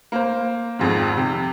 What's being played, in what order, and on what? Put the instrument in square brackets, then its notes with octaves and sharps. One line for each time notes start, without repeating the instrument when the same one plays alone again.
[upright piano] A#3 C5
G#1 F2 G#2
C3